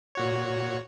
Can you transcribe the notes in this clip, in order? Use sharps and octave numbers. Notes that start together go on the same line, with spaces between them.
A#2 F#4 C#5